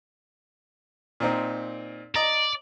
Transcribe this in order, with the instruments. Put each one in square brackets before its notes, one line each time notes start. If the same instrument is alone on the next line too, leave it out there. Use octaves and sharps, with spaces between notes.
[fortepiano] A#2 C4 D#4
[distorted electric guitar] D5 [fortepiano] D#5 A#5